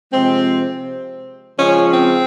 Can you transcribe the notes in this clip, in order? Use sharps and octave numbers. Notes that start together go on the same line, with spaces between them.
C3 F3 G#3 C4
C#3 F3 G#3 C#4
C4